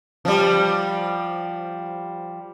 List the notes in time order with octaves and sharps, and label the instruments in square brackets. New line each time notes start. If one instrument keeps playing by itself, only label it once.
[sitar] F3 G3